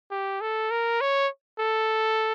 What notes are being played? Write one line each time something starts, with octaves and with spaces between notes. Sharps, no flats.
G4
A4
A#4
C#5
A4